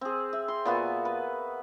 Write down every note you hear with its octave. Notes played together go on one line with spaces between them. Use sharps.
C4 G#4
E5
C6
A#2 B3 F#4 G#5
B4